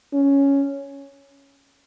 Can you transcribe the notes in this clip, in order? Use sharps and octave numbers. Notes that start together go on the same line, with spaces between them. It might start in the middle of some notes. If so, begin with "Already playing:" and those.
C#4